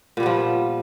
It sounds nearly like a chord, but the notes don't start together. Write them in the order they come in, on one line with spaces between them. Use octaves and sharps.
A#2 G3 B3 F3